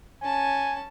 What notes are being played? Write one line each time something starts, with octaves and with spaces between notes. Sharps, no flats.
C#4 G#5 A5